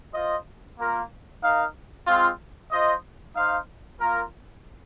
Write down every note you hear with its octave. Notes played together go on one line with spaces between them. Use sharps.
F4 C5 D#5
A#3 F4 A#4
D#4 A#4 F5
G#3 C4 F4
F4 C5 D#5
D#4 C5 F5
A#3 F4 A#4